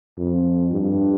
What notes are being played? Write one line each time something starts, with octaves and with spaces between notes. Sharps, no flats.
F2
G2